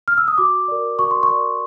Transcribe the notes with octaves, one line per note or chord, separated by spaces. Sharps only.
F6
E6
D#6
F#4 D6
A#4 D5
F#4 C#6
C6
C#6
A#4 D5